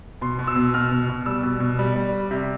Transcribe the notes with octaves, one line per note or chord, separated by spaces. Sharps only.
B2 C6
B2
E6
B2
B2 F6
B2
B2
G3 E6
B2
B2
G3
G3
G3
C3